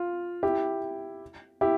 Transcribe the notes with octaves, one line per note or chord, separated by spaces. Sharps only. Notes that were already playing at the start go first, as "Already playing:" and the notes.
Already playing: F4
E4 G4
E4 G4